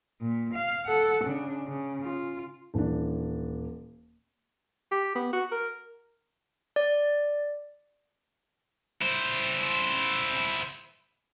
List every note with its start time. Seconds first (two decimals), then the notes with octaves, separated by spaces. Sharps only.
0.21 A#2
0.54 F5
0.88 A4 F#5
1.25 C#3 D4
1.68 C#3
2.04 F4
2.74 D#1 E3 D4
4.92 G4
5.15 B3
5.33 F#4
5.52 A#4
6.76 D5
9.01 E4 C5